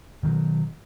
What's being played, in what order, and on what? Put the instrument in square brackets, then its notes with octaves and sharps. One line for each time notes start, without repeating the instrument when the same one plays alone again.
[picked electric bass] B2 D#3 E3 F#3